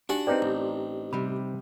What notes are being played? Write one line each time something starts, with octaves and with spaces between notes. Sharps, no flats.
D4 D#4 F#4 G4 F#5 G#5
C4 D#4 G4 B4 D5
A1 E4
C3 G3 B5